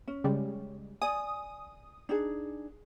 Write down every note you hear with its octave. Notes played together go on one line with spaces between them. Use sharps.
C#4
C#3 G3 G#3
D5 G#5 D#6
D4 D#4 G#4